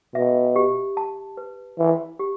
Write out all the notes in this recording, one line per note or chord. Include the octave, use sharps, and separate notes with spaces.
B2 E5
G4
A5
B4
E3 E5
G4